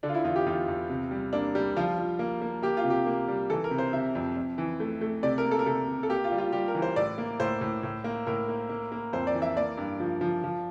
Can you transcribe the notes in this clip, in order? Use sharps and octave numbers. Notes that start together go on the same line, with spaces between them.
D3 D4
F4
E4
E2 F4
G4
E2 F4
E2
C3
G3
A#3 D4
G3
F3 F4
F3
A#3
A#3
A#3 G4
F4
C3
G4
A#3
G3
E3 A4
A#4
C3
C5
C3 E5
F2
F2
E3
A3
A3
C3 D5
A#4
A#3
A4
A#4
C3 A4
C3
A4
A#3 G4
F4
G3
F4
G3 G4
A#4
E3
C5
A2 D5
A#3
A2 C5
A2
A2
A#3
A2 A#4
A#3
A#3
A#3
F2 C5
D5
E3
E5
A#3 D5
G2
F3
F3
F3